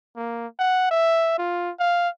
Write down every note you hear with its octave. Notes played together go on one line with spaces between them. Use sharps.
A#3
F#5
E5
F4
F5